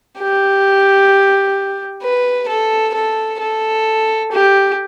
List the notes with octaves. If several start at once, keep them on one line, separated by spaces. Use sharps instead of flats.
G4
B4
A4
A4
A4
G4